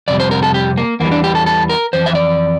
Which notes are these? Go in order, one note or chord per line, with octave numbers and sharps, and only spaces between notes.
F2 C3 G3 D5
C5
A#4
A4
G4
A#3
E2 E3 G3 A#3
D4
G4
A4
A4
A#4
F2 E3 C5
E5
D5